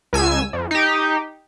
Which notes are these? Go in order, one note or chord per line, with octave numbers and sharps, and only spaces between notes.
C#2 G#5 E6
F2
D#4 G4